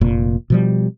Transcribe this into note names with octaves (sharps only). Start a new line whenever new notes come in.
F1 A#2
B2 F3 G3